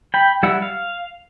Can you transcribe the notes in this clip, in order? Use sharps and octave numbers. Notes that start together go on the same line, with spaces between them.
G5 B5
G3 E4 F#5 E6
F5